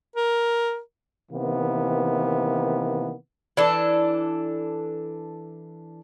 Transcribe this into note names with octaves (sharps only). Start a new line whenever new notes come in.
A#4
C3 D#3 E3 A#3 B3
E3 D4 A4